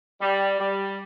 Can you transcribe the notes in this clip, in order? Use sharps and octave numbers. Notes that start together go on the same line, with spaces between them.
G3
G3